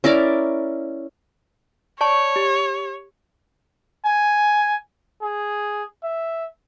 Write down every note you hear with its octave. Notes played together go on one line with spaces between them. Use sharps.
C#4 E4 A#4 D5
C#5 D5 A5 C#6
G4
G#5
G#4
E5